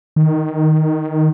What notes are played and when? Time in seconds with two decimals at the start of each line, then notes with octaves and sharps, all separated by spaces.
0.16 D#3